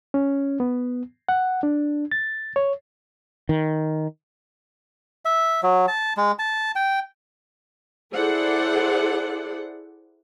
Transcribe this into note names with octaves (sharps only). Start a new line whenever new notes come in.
C#4
B3
F#5
D4
A6
C#5
D#3
E5
F#3
A5
G#3
A5
G5
E4 G#4 A4 C5 D5 F#5